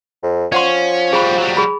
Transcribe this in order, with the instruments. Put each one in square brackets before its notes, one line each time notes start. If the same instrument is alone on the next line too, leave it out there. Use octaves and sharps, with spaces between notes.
[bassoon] F2
[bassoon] F3 [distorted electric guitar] C#4 [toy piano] D5 F#5 C6
[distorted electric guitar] G3 F#4 [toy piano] G#4 B5
[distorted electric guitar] F#3 G3
[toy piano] G#4 B5